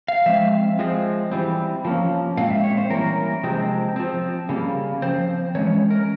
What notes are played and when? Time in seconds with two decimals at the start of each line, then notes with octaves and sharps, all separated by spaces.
0.08 F5
0.26 F3 G#3 C4 E5
0.79 F3 G#3 C4
1.32 E3 G3 C4
1.85 F3 A#3 C#4
2.37 A#2 G#3 C4 F5
2.50 E5
2.64 C#5
2.77 C5
2.90 E3 G3 A#3 C#4 A#4
3.43 C3 F3 G#3 C4
3.96 F3 C4
4.49 C#3 G3 A#3
5.02 F3 C4 C5
5.55 E3 G#3 C#4 C#5
5.90 A#4